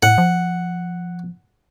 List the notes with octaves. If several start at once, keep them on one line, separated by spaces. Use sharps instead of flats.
A2 F#5
F3